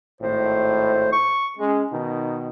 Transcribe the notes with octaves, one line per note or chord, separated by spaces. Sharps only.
G#1 A2 C5
C#6
G#3 C#4
B2 D#3 D#4